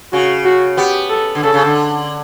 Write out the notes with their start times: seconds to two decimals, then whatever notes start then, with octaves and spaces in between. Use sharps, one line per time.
0.13 C#3 F#4
0.45 F#4
0.77 B3 G4
1.10 A4
1.35 D3
1.43 C#3 A4
1.54 C#3
1.65 D3